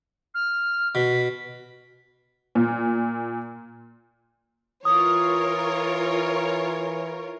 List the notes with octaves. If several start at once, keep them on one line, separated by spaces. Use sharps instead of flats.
F6
B2 B6
A#2
E3 F4 A#4 C#5 D#6